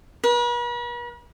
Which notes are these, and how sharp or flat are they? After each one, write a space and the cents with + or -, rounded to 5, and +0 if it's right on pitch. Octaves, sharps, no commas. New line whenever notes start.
B4 -45